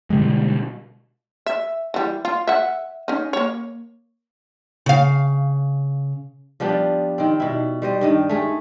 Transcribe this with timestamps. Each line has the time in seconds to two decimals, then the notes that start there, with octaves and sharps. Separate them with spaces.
0.10 B2 D3 G3 G#3
1.46 E5
1.94 E3 G3
2.25 F4
2.47 E5 F#5
3.08 C#4 D#4
3.33 A#3 C#5
4.86 C#3 F5
6.60 F3 G3 B3 D4
7.18 D#3 C4
7.40 B2 E4
7.82 G3 C5 D#5
8.01 G2 D#3 D#5
8.29 A3 G#4